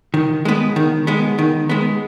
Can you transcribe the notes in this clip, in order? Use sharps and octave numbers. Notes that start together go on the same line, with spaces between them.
D#3
G#3 B3
D#3
G#3 B3
D#3
G#3 B3